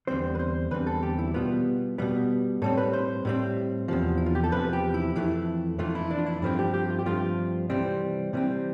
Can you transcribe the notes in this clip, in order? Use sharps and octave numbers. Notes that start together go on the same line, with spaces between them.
E2 D3 G3 C4 C5
B4
C5
E2 D3 G3 C4 B4
A4
G4
E4
B2 G3 B3 F4
B2 G3 B3
A2 G3 C4 A4
B4
C5
A2 G3 C4
E2 C3 F3
E4
F4
G4
A4
E2 C3 F3 B4
G4
E4
F2 E3 A3 E4
F2 E3 A3 F4
E4
D4
F4
E4
G2 F3 A3 C4 E4
G4
G4
F4
G4
G2 F3 A3 C4 F4
C3 E3 G3 C4
C3 E3 G3 C4